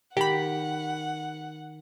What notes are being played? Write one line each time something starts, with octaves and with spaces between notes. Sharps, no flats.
D#3 G4 F#5 B5